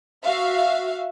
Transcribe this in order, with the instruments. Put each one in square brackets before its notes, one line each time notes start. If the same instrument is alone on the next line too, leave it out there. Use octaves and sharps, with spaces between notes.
[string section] F#4 E5 F5